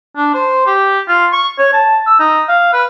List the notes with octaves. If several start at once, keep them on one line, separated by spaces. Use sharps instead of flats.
D4
C5
G4
F4
C#6
C#5
A5
E6
D#4
F5
B4